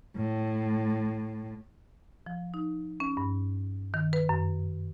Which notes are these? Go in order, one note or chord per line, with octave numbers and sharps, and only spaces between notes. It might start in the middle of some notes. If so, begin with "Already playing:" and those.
A2
F3
D#4
C#4
G2
D#3
B4
F#2